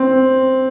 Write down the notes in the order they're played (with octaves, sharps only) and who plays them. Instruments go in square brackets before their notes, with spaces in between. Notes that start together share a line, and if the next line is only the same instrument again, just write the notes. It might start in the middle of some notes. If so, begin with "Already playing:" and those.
Already playing: [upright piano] C4